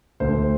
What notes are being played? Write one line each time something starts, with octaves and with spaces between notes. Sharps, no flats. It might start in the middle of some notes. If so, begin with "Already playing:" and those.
D2 C5